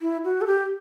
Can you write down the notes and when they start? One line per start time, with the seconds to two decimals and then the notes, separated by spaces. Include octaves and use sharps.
0.01 E4
0.24 F#4
0.41 A4
0.47 G4